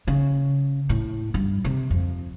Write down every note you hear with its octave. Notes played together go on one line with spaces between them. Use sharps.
C#3
A2
G2
C3
F2